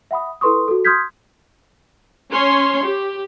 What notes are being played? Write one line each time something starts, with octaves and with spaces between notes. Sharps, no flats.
E5 F#5 B5 D#6
E4 A4 B4 C6 C#6 D#6
F#4 A4
C6 D#6 F6 G6 G#6 B6
C#4 C#5 C6
G4